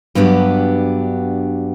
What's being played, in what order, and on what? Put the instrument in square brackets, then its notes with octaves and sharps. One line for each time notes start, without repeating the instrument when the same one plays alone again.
[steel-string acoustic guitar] G2 F#3 B3 D4 G4